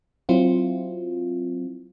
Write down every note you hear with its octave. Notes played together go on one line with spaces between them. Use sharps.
F#3 C4 E4 F4